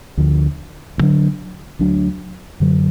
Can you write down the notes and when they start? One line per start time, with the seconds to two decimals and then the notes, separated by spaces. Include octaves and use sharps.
0.17 D2 D3 F3
0.98 D2 D3 F#3 D4
1.79 D2 D3 F#3 D4
2.60 F#2 D3 F#3